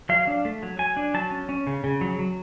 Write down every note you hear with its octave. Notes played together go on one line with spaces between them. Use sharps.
F#3 F5
D4
A3
F#3
F#3 G#5
D4
F#3 A5
C#4
C#4
C#3
C#3
F#3
F#3